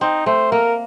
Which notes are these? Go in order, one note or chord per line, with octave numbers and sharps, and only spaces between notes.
C4 D#4
A3 C5
A#3 A#4